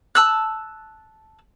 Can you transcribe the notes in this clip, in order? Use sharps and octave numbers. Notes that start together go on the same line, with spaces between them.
A5 E6 F#6